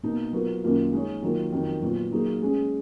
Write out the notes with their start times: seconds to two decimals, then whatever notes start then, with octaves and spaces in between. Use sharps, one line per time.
0.03 B2 A#3 D#4
0.33 F#3 B3 F4 A#4
0.63 F#2 D#3 A#3 F4
0.92 G#3 D#4 G#4 C#5
1.22 D#3 F#3 A#3 F4 A#4
1.52 F2 D#3 F#3
1.82 A#2 F#3 B3 F4
2.12 F#3 A#3 D#4 G#4
2.42 G#3 C#4 G#4